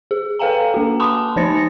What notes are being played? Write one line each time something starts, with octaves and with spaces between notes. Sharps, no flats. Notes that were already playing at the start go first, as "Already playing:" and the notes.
G#4
A4 B4 F5 G5 G#5 A#5
A#3 F#4
G#5 A5 B5 C6 D6 D#6
F3 D#4 C5 A6 A#6 C#7